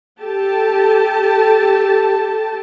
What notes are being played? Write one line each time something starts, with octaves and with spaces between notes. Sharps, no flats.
G4 A4 A5